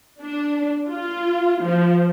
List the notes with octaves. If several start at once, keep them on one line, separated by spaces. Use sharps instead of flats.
D4
F4
F3